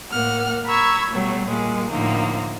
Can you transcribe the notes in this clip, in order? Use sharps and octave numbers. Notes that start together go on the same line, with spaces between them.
A2 A#3 F#5 F6
A#5 B5 C#6 E6 G#6
B2 F#3 G3 A3
A#2 G3 G#3 A#3
A2 D3 F3 A#3 D#4